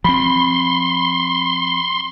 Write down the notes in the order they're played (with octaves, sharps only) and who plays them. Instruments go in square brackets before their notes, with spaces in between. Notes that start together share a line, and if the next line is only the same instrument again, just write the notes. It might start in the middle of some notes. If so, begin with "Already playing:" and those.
[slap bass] F3 C4 [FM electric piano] B5 [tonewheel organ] C6